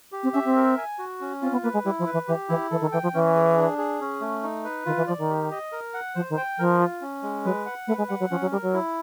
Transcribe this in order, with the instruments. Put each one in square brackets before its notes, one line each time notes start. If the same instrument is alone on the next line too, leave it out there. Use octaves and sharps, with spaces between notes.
[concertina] G4
[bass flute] C4
[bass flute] C#4 [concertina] E5
[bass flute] C4
[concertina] A#4
G#5
F#4
C#4
[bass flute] C4 [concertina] F4
[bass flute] B3
[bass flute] A#3 [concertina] B4
[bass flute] G#3
[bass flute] G3 [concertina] E4
[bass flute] F3
[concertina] B4
[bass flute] E3
[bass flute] E3 [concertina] G4
[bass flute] E3 [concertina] E4
[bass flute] E3 [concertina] A4
[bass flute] D#3
[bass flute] E3 [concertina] G5
[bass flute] F3
[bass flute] E3 [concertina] C#4
[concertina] G#4
D4
G#4
C#4
A3
D#4
B4
[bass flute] D#3 [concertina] F4
[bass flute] E3
[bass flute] F3 [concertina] D5
[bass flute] D#3
[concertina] G4
D#5
A#4
F#5
[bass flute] F3 [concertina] C5
[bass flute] D#3
[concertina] G5
[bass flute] F3 [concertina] A#4
[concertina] F4
C#4
G#3
[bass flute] F#3 [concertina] B4
[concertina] F#5
[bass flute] A3 [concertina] B4
[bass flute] G#3
[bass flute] G3 [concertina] F#5
[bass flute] F#3
[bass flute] F3 [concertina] C#4
[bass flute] F#3
[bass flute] G3 [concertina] A#4
[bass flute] F#3
[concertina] E4